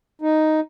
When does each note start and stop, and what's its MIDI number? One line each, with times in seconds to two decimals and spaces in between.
0.22 0.60 63